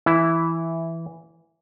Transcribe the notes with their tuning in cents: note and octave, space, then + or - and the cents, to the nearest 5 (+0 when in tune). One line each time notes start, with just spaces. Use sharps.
E3 +0 E4 +0